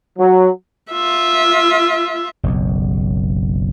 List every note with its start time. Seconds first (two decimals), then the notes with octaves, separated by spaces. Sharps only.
0.19 F#3
0.92 F4 E5
2.43 F#1 B1